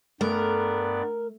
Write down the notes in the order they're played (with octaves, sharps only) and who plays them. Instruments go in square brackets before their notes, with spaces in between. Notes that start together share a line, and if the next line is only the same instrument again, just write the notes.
[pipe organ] G2 B3 D5 [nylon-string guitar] A3 [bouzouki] A#4